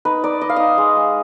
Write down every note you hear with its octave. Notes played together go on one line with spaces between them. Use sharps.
D#4 B4
D#4 D5
D#4 D#5
F5
D#4 D#5
G#3
G#3